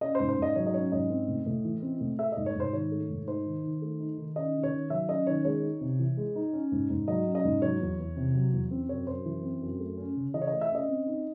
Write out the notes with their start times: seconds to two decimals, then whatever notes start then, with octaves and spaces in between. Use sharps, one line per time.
0.01 C#4 D#5
0.15 C5
0.20 G#2
0.29 C5
0.38 G#2 D#5
0.56 F#3 C#5
0.66 D#5
0.74 C#4 C#5
0.92 G#2 D#5
1.10 C4
1.28 A2
1.46 A2
1.65 E3
1.82 C4
2.01 A2
2.19 A3 E5
2.32 G#2 D#5
2.46 C#5
2.55 G#2 C5
2.73 D#3 C#5
2.92 A3
3.09 G#2
3.28 D#4 C5
3.46 D#3
3.64 D#3
3.82 A3
4.00 D#4
4.18 D#3
4.36 C#4 D#5
4.54 D#3
4.63 C#5
4.72 D#3
4.90 F#3 E5
5.08 C#4 D#5
5.27 D#3 C#5
5.45 G#3 C#5
5.63 D#4
5.81 C3
5.99 E3
6.17 G#3
6.36 D#4
6.53 C#4
6.72 G#2
6.90 G#2
7.08 F#3 D#5
7.26 C#4
7.35 D#5
7.44 G#2
7.62 F#3 C#5
7.80 E2
7.99 E2
8.17 C3
8.35 F#3
8.53 E2
8.71 C4
8.89 F#2 C#5
9.07 F#2 C5
9.25 E3
9.43 C4
9.62 F#2
9.80 A3
9.98 C#4
10.16 C#3
10.34 E3 D#5
10.42 C#5
10.47 D#5
10.53 A3
10.61 E5
10.70 C#4 D#5
10.89 C4
11.06 D#4